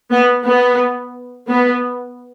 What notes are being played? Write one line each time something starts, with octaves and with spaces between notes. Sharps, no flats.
B3
B3
B3